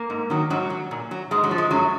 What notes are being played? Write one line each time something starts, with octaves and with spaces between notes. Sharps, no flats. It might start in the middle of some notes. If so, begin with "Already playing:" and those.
Already playing: A#3
G#2
D#3 F#3
G#2 F#3
F#3
A#2
F#3
G#2 G#3
F#3
F3
G#3
F#2 F#3